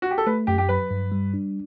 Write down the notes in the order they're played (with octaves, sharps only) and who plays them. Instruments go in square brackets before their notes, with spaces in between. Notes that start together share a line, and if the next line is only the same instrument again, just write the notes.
[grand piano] F#4
G4
A4
[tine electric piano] A3 [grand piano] B4
[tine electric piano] F#2 [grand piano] G4
[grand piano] G4
[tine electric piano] F#3 [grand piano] B4
[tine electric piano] G2
G3
D4